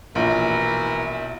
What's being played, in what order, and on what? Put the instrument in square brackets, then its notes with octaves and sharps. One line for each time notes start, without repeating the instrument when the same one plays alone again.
[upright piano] A#1 [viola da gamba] B2 E4 [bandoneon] E3 A#4